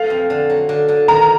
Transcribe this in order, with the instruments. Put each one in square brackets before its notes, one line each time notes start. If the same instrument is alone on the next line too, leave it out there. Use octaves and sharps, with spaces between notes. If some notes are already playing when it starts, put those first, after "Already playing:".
Already playing: [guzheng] A3 [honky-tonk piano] F5
[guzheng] F2
D3
F#3
D3
D3
[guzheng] D#3 [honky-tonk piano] A#5